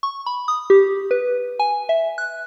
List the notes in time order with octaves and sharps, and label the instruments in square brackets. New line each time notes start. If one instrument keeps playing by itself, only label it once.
[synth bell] C#6
B5
D#6
G4
B4
G#5
E5
F#6